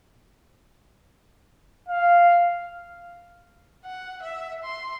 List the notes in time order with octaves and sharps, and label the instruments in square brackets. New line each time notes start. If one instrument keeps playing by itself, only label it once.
[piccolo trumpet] F5
[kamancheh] F#5
E5
C6